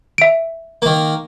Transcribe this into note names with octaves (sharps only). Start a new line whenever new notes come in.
E5 D7
D#3 A#3